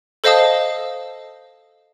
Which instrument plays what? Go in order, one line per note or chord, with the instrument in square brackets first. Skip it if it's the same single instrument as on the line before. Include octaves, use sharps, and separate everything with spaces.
[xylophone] A4 C5 D#5 F5 A5 D#6